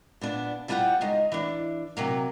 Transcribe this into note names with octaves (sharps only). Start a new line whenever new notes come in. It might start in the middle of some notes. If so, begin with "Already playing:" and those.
A#2 B3 D4
E2 G3 F4 G4 F#5 G5
C#3 G#3 D#4
E3 D4
C3 F#3 A#3